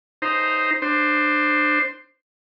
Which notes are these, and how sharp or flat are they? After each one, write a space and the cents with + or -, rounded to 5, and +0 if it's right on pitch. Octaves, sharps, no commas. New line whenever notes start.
D#4 +0 C5 +0 A#5 +0
D4 +25 C5 +0